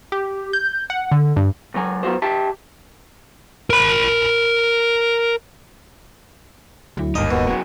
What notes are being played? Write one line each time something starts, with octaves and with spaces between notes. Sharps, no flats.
G4
G6
F#5
D3
G2
C#2 F#3 G#5
F#3 B3 F#4 C5
G4 E5 G5 A5
A#4 B5
D2 F#3 E4
G#1 D2 G2 A#3 D#4 D#5
D#1 B2
C#3 F#3